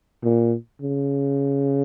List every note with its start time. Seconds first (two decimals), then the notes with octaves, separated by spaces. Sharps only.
0.24 A#2
0.82 C#3